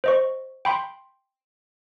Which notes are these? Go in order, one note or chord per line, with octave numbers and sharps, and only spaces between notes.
C5 D#5 C#6
G5 B5 C6